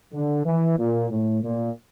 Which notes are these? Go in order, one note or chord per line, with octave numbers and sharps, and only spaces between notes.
D3
E3
A#2
A2
A#2